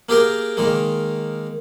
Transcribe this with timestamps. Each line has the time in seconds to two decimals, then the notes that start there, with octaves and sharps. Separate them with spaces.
0.09 A#3 G4 G#4 A#4 G5
0.57 D#3 G#3 A#3